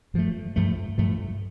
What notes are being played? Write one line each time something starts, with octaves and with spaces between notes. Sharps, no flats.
G2 F3 A3
G2 F3 A3
G2 F3 A3